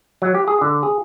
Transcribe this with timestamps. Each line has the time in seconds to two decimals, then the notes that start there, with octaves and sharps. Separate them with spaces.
0.22 F#3
0.35 G4
0.48 G#4
0.61 D3
0.83 G#4